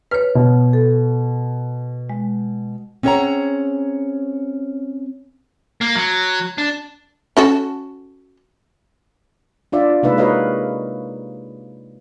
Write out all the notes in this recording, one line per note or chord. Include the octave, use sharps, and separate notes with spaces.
B4 C#5 F6
B2
A4
G#3
C4 C#4 G#4 C#5 F#5 A#5
A#3
F#3
D4
C#4 F#4 A4
D4 F4 D5 E5
C3 G#3 A#3 D#4 B4 E5
F#4 A#4 B4 C#5 D#5 F5